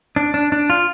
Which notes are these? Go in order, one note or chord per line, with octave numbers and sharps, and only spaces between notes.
D4
D4
D4
F4